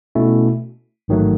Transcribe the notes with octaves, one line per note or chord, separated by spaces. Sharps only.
B2 A3 C#4 E4
A1 G#2 D#3 F#3 A3